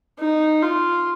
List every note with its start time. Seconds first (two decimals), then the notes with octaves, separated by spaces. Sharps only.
0.20 D#4
0.63 F4